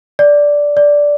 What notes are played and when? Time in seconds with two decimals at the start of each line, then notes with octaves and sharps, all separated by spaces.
0.19 D5
0.77 D5